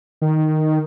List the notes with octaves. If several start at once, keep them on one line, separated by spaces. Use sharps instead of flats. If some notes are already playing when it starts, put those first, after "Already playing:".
D#3